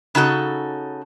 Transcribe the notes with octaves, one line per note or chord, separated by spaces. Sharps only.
C#3 D#4 F#4 A4